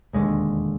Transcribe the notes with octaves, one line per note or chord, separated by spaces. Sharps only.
E1 D#2 D3 G#3